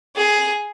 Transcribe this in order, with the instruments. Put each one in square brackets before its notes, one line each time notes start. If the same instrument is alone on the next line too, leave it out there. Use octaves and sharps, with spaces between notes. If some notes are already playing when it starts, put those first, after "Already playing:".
[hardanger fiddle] G#4